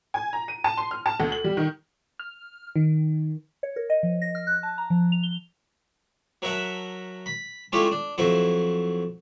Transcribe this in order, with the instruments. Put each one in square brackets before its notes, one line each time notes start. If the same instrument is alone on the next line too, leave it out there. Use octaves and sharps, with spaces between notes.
[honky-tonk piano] G#5
A#5
D#7
A5
C6
F6
A5
D2
F#7
G3
D#3
[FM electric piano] F6
D#3
[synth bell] C#5
A#4
D#5
F3
A#6
F6
F#6
A5
A#5
F3
F7
G7
[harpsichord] F#3 A#4 E5 F#5 A5
B5
G#3 A3 C#4 E4 F4 G4
D4
F2 F#3 E4 C5